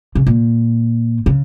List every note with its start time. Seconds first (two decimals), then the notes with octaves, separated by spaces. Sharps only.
0.15 C#3
0.27 A#2
1.26 C#3